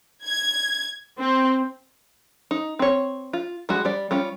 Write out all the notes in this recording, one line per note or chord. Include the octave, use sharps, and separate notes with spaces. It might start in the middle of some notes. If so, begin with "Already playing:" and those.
G#6
C4
D#4
C4 C#5
F4
G3 G#3 F#4
G3 D5
G3 C#4 F4